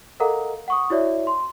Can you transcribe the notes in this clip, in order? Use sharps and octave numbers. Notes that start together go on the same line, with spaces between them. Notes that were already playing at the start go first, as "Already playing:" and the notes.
A4 A#4 D#5 F5 F#5 A#5
F#5 C#6 D#6
E4 F#4 C#5 D5 E5
C6